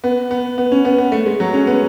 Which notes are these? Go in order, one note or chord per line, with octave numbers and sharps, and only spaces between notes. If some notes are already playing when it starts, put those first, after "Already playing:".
B3
B3
B3
C#4
B3
B3
A3
G#3
F#3
C#4
B3